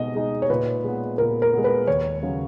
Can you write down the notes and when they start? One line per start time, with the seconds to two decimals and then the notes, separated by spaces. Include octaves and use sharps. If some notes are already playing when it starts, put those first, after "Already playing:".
Already playing: B2 G#3 D#4 D#5
0.15 G#3 D#4
0.42 C#5
0.50 A#2 B4
0.84 G#3 B3
1.18 A#2 A#4
1.42 A#4
1.53 G#3 B3
1.64 B4
1.87 D#2 C#5
2.23 C#3 F#3 C#4